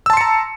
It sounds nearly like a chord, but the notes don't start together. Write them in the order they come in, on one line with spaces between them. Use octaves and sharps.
E6 A5 C6 C#7 A#5